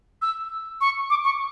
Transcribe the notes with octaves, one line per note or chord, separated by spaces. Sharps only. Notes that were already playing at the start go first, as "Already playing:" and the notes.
E6
C#6
D6
C#6